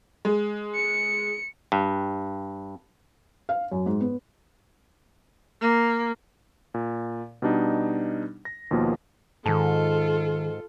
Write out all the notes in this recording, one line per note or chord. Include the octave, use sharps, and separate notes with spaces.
G#3
C#7
G2
F5
F#2
G#2
B3
A#3
A#2
B2 G3 D4 D#4
A#6
D#2 B2 F3 A#3
G#2 D#3 F4 A4 A5